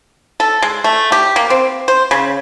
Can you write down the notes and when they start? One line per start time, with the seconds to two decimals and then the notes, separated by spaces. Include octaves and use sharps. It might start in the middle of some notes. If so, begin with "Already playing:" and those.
0.40 A4
0.62 G#3
0.84 A3
1.12 G4
1.36 A#3
1.50 C4
1.88 C5
2.11 C#3